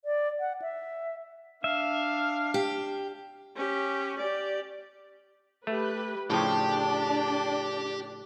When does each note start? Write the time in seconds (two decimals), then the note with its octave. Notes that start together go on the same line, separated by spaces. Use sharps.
0.05 D5
0.40 F#5
0.62 E5
1.64 D4 E5 F5
2.54 G4
3.56 C#4 G4
4.18 G4 D5
5.67 A3 G4 B4
6.30 A2 C#3 F3 D4 G4 D5 G5 A5